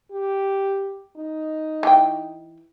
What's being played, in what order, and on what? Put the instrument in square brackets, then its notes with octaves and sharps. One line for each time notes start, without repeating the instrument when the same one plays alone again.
[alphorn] G4
D#4
[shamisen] E3 G5